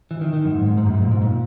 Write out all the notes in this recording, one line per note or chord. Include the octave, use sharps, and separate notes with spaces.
E3
D#3
D#3
F#2
G#2
G#2
G#2
F#2
G#2
A#2
G#2
A#2